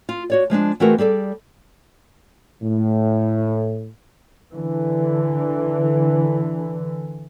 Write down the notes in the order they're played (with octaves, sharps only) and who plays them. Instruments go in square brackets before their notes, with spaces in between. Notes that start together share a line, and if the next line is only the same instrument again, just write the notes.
[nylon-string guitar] F4
F#4 C#5 D5
F3 G#3 C4 D4
E3 A3 C4 F#4 G#4 A#4
G3 G#4 A4 D5
[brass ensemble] A2
[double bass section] D3 E3